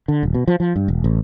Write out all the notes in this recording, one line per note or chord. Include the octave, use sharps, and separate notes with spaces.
D3
D#1
B2
F3
F3
G2
E1
A1